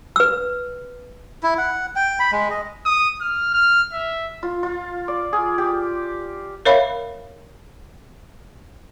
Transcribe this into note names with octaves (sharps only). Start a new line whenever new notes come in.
B4 E6
E4
F#5
G5
B5
G#3
D#5
D#6
F6
F6
E5
F4
F4
D5
G#4
G4
A#4 C#5 E5 F5 B5